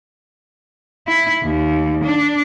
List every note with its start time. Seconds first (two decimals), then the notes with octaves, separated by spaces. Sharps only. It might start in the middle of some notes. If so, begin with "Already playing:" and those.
1.08 E4
1.43 D#2
2.04 D4